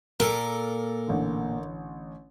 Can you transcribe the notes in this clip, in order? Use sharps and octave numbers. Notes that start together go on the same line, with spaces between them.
A#2 A4 A#4
A1 D3